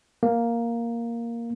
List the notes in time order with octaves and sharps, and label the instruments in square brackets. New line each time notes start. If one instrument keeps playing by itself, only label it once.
[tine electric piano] A#3